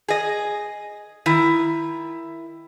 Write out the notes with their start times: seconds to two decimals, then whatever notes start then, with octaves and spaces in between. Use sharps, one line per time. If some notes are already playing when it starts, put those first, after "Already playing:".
0.08 G#4 D#5
1.26 D#3 E4